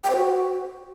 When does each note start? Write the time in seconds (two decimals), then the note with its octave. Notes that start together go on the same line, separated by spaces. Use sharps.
0.04 G5
0.10 C5
0.16 F#4